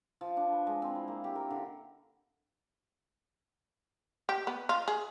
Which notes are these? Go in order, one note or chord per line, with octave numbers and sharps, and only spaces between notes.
F3
D4
B4
G#3
C4
E4
A#3
G4
A#4
D3
G4
B3
F4
G#4